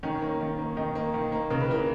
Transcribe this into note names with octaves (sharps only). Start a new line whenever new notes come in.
D#3 C#4
A#3
D#3
A#3
D#3 D#4
A#3
D#3
A#3
C#3 A#4
B4
E3 A#3 A#4